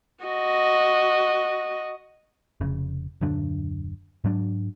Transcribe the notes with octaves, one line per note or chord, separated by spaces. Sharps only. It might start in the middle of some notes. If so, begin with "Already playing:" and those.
F#4 D#5
F1 C#3
D#1 F#2 D3 D4
G#2 F#3 D4